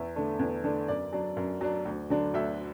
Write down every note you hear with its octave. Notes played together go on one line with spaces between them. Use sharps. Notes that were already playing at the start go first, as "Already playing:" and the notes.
Already playing: E2 E5
D3 A3 D4
E2
D3 A3 D4
F#2 D5
F#3 D4
F#2
F#3 D4
D2
D3 F#3 D4
D2 E5